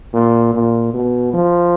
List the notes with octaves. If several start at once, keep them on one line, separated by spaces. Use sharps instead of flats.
A#2
A#2
B2
F3